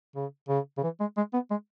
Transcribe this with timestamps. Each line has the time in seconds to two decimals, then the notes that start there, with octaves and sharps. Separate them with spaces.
0.16 C#3
0.49 C#3
0.78 C#3
0.83 E3
1.00 G#3
1.17 G#3
1.34 B3
1.50 G#3